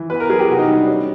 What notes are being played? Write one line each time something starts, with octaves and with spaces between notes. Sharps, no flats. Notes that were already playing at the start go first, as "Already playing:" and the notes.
Already playing: E3
B3 B4
A#4
F#3 G#4
G4
C3 F#4
D#4
G3
D4
C#4